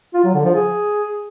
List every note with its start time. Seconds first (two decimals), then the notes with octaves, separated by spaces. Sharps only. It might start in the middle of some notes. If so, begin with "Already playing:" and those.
0.14 F4
0.25 F#3
0.35 D3
0.45 F3
0.55 G#4